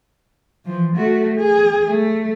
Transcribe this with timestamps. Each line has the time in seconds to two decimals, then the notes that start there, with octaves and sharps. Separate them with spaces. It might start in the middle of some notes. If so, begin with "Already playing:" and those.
0.65 E3 F3
0.95 A3 F#4
1.36 G#4
1.89 A3